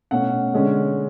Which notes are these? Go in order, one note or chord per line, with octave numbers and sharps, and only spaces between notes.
B2 A3 C#4 F#5
D3 G#3 C#4